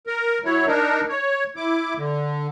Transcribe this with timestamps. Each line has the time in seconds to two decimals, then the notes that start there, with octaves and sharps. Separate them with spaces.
0.07 A#4
0.45 F#3 E4 C#5
0.67 D4 D#4 A#4
1.09 C#5
1.56 E4 D6
1.97 D3